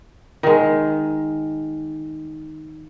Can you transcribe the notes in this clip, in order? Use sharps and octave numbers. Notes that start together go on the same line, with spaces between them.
D#3 G#3